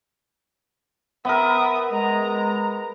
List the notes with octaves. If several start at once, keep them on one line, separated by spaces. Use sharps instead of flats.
B3 A#4 E5 D#6
G#3 A#5